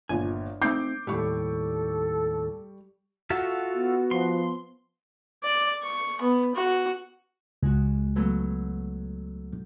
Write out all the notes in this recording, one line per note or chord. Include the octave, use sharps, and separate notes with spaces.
G1 A#2 G#5
A3 C4 D#4 D6 G6 C7
D#2 A2 G3 A4 C#6
F4 F#4 A4 E5
B3
F3 C6
D5
C#6
B3
F#4
C#2 G#3 F#4
F#3 A3 B3